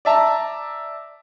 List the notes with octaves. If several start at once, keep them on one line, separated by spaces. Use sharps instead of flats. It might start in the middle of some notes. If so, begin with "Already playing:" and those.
D5 E5 A5 A#5